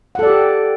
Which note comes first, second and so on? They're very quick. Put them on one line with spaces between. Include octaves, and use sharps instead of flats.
F#5 A4 D5 G4